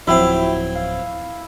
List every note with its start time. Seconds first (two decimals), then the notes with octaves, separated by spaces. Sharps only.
0.07 D1 F3 F#3 C4 E4 F#4 E5 G5
0.75 F5